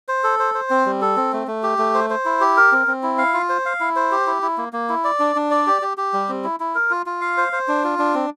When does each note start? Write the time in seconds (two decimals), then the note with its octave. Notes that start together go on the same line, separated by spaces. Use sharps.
0.08 C5
0.23 A4
0.39 C5
0.54 C5
0.70 C4
0.86 G3
1.01 A4
1.17 C4
1.33 A3
1.47 A3
1.63 G4
1.78 A3
1.94 C5
2.10 C5
2.25 E4
2.41 G4
2.57 A#4
2.72 C4
2.87 C4
3.03 E4
3.18 F5
3.34 F4
3.49 C5
3.65 F5
3.80 E4
3.96 C5
4.12 G4
4.27 E4
4.42 E4
4.58 A#3
4.73 A#3
4.89 E4
5.04 D5
5.20 D4
5.36 D4
5.51 D5
5.67 G4
5.82 G4
5.97 G4
6.13 G3
6.29 C4
6.44 E4
6.60 E4
6.75 A#4
6.90 F4
7.06 F4
7.21 F5
7.37 C5
7.53 C5
7.68 D4
7.84 F4
7.99 D4
8.14 C4